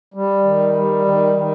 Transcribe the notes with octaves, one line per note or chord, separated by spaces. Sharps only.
G3
D#3
G3
D#3
D#3